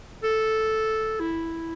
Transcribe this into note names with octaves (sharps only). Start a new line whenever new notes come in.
A4
E4